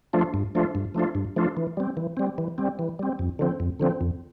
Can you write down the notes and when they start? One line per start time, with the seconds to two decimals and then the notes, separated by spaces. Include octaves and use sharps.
0.13 F3 A3 D4 F4
0.34 G2
0.55 F3 A3 D4 F4
0.75 G2
0.94 F3 A3 D4 F4
1.15 G2
1.36 F3 A3 D4 F4
1.57 E3
1.77 G3 C4
1.97 E3
2.17 G3 C4
2.38 E3
2.58 G3 C4
2.79 E3
2.99 G3 C4
3.19 F2
3.39 D3 F3 C4
3.60 F2
3.80 D3 F3 C4
4.01 F2